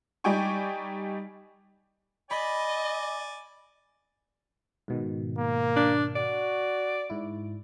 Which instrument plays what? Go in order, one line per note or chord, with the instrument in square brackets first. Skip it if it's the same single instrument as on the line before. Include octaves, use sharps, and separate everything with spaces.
[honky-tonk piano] G3 D#4 D5 G5 G#5 C#6
[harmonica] D5 G#5 [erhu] D#5 [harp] B5
[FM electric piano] G#2 B2 D#3
[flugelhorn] A#3
[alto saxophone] D4
[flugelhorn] F#4 [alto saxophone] D5
[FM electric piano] G#2 E4